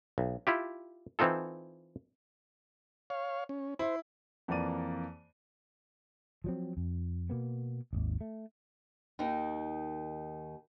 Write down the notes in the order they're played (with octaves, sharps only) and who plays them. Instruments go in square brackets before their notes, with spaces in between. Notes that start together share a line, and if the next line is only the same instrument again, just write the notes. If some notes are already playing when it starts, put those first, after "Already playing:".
[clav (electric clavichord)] B1
E4 F4 G4
E3 C4 D#4 F4 A4
[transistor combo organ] C#5 F5
C#4
[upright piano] E4 [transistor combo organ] C5
[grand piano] F2 E3 A#3 D5 D#7
[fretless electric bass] F3 F#3 C4
F2
B2 A#3 B3
D1 G#1 D#2
A3
[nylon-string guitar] D#2 D#3 D#4